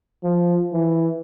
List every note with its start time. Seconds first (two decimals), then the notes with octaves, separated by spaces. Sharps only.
0.24 F3
0.73 E3